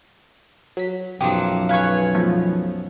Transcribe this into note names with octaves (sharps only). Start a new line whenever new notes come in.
F#3 B6
B1 F#2 F3 F#3 G4 D6 D#6
B4 C#5 F5 G#5 C#6
F3 A3 B3